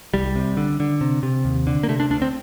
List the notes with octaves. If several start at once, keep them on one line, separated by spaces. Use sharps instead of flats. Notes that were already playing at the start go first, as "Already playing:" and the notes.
C2 G3
C3
D3
D3
C3
C3
D#2
D3
A#3
C3 A3
D4
D2 D4
C4